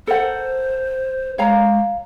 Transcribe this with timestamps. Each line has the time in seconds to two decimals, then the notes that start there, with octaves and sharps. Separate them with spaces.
0.07 A4 A#4 C5 F#5
1.38 G#3 C#5 F5 A#5